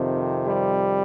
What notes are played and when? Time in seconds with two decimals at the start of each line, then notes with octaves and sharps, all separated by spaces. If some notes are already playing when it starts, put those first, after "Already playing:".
Already playing: F2 C3 D#3
0.45 G3